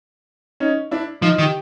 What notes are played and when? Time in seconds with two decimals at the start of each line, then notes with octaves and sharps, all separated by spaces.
0.60 C#4 D#4
0.91 D4 E4
1.22 F3 D#4 F4
1.39 D#3
1.42 G4